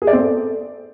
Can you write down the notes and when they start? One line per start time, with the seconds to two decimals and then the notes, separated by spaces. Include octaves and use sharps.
0.02 G#4
0.07 D5
0.13 C4
0.19 A4